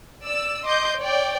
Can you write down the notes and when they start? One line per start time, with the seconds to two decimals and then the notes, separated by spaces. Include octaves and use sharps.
0.22 D5 E6
0.65 D#5 C6 D6 G6
0.99 C#5 D5 G5